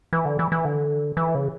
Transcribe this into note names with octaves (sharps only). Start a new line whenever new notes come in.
E3
D3
E3
E3
D3
E3
C#3